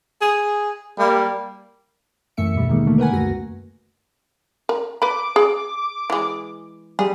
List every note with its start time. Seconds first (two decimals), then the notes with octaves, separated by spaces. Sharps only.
0.21 G#4
0.98 G3 A#3
2.37 F#2 E3 A3 E5 C#7
2.54 D#2 B2 G3
2.69 D#3 G#3 A#3
2.86 D3 A3 A#3
2.98 A#4 B4 F#5 G#5
3.12 C#2 F#2 A3 F#4 A#6
4.69 A#4
5.02 B4 B5 D6
5.36 G#4
6.10 E3 G#3
6.99 G3 G#4